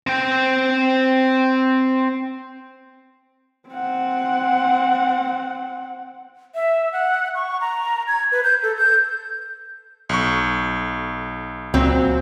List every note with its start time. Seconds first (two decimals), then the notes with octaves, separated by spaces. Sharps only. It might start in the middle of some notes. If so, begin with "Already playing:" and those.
0.07 C4 G5
3.69 C4 F#5
6.55 E5
6.93 F#5
7.35 C#6
7.61 A#5
8.08 G#6
8.32 B4
8.44 G6
8.63 A4
8.77 G6
10.09 B1 C#6
11.74 C#2 A#2 F#3 C4